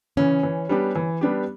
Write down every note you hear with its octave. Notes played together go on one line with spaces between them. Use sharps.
C#3 E3 C#4
E3
G3 B3 D4 G4
E3
G3 B3 D4 G4